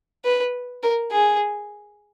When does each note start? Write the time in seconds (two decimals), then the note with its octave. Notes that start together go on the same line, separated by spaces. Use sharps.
0.24 B4
0.83 A#4
1.11 G#4